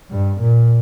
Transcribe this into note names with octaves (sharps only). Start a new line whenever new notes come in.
G2
A#2